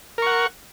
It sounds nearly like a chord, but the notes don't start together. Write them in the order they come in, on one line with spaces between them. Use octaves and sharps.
A#4 C#6 F#5